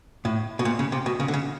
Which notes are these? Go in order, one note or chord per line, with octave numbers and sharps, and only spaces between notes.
A2
B2
A#2
C#3
C3
B2
C#3
D3
C#3